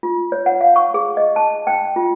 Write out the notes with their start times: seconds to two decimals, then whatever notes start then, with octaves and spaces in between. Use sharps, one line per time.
0.03 F4
0.32 C#5
0.46 F#5
0.61 F5
0.76 C#6
0.94 G#4
1.17 D#5
1.36 A5
1.67 G5
1.96 F4